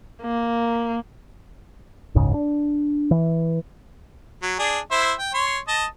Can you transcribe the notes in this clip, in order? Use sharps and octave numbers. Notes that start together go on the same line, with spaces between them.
A#3
F#1 C#2 G#2 C#3
D4
E3
F#3
D4 G#4
E4 C5 E5
G5
C#5 C6
D#5 A5